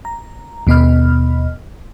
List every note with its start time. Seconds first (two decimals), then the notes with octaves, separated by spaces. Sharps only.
0.05 A#5
0.67 D#2 B2 B3 D#5 B5 F6